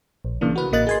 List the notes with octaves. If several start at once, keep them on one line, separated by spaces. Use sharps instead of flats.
A#1
C#3 E3 A#3 D4
F#4 B4
A1 A#3 D#5 F#6 A6
G#4 G#5 C6